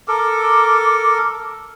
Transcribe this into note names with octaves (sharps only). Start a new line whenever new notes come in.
A4 A#4 D6